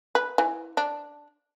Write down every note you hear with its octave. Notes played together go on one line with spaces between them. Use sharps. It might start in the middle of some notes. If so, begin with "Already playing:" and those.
B4
E3
D4